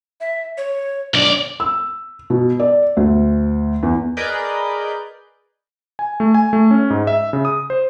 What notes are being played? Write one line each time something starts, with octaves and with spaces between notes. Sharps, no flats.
E5
C#5
B1 D4 D5
E6
B2
D5
D2
E2
G#4 A#4 B4 D5 D#5 G6
G#5
A3
G#5
A3
C#4
G#2
E5
C#3
D#6
C5